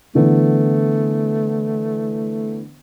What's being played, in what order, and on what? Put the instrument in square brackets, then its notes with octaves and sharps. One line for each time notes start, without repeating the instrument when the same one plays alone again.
[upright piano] D3 E3 B3 [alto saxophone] A3